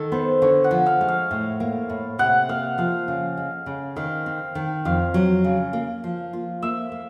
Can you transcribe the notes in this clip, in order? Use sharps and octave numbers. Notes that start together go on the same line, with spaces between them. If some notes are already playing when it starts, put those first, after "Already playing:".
Already playing: D#3 A4
B3 C5
D3 C#5
F#5
F3
F5
G#3
F5
A2
A#3
A2
C3 F#5
A#3 F5
F3 F5
C#3
G#3
C#3
D#3 F5
C4
D#3
F2 F5
F#3
C#3
A#3
F3
F4
A#3 E5
A#3